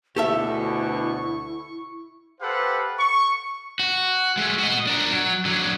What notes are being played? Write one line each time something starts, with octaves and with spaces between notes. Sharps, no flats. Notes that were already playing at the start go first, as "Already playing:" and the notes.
D2 B2 E4 G4 A4 E5 C#6
G4 A4 B4 C5 F5 F#5
C#6
F#4
G#3 A3
F#4 D#5
D4 A#4
F#3
D3 F#3